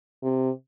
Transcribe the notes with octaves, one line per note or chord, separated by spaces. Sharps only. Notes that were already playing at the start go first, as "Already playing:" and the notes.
C3